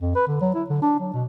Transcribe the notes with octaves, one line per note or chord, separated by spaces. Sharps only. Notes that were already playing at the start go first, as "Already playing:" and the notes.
F2
B4
D3
F#3
E4
D3
D4
F#3
B2